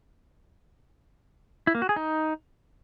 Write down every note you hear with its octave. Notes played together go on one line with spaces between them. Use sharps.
E4
A#3
F#4
G#4
D#4